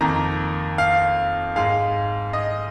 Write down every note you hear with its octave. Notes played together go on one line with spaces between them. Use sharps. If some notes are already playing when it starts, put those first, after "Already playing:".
F2 D#3 A#3 A#5
F5
G#2 G#3 F5
D#5